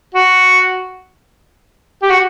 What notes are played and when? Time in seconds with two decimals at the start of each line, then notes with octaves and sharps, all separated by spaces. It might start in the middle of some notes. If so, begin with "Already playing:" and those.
0.14 F#4
2.02 G4
2.10 F#4